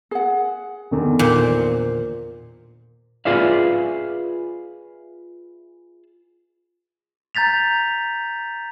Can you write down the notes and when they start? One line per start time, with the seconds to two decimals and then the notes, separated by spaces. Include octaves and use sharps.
0.11 G#4 F#5
0.91 E2 D3 D#3
1.19 A#2 C5
3.25 F4 G#4 B4 D5 E5 F5
7.35 A#5 G6 A6 B6 F7